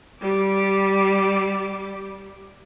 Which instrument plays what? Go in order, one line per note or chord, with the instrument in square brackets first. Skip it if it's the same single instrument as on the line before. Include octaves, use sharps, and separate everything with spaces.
[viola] G3 D6